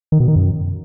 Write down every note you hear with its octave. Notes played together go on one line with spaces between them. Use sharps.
D#3
B2
D#3
F#2